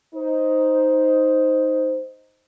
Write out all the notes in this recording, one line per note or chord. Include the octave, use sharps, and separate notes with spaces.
D#4 C5